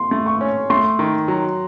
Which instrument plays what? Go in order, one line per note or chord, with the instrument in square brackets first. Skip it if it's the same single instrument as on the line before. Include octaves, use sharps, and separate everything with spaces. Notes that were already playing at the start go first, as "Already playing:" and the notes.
Already playing: [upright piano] C6
[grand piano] A3
[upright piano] C#6
[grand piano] C#4
[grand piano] A3 [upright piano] C6
[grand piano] D#3
F#3